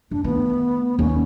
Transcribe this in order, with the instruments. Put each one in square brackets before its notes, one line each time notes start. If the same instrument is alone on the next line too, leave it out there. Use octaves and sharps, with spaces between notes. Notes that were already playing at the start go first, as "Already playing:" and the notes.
[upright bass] F#2 [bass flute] D4
[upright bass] D#3 A3 [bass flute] B3
[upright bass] D#2 G#2 [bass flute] C#4